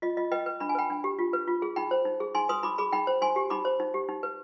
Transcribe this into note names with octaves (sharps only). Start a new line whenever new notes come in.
F4 D#5
F4 D#5
B4 D#5 G5
B4
D4 B5
G#5
B4 G5 B5
D4
G4
F4
B4
F4
G#4
D#4 G5 B5
C5
D#4
G#4
D#4 G#5 C6
B4 C6 D#6
D#4 B5 D6
G#4 B5 D6
D#4 G5 B5
C5
D#4 G#5 C6
G4
D#4 B5 D6
C5
D#4
G4
D#4
B4